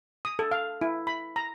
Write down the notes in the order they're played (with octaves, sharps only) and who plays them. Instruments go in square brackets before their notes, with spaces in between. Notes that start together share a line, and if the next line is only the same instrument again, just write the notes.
[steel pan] D#6
A4
F5
E4
B5
A#5